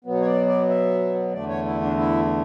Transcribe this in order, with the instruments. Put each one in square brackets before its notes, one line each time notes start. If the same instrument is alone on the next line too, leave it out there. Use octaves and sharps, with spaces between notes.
[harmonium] B2 F#3 B3
C#5
D5
D5
E5
E2 D3 A3 D5
C#5
E4
D4
E4